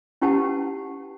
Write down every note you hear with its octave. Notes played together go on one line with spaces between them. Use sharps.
C#4 E4 G4 B4 F#5 A5